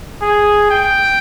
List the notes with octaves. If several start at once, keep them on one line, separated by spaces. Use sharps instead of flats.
G#4
G5